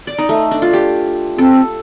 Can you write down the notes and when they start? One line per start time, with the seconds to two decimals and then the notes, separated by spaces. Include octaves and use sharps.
0.07 D5
0.18 D#4
0.29 A3
0.51 D4
0.62 F4
0.73 G4
1.38 C4 A4